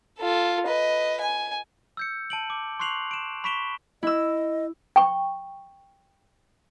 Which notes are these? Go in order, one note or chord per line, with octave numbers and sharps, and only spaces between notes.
F4 A4
B4 D#5
G#5
E6 G6 C#7
A5 D7 F#7
D6
C6 C#6 F#6 C7 F7 F#7
D7 E7
B5 C#6 B6 D7 E7 G7
E4 D#5 E6
G5 C#6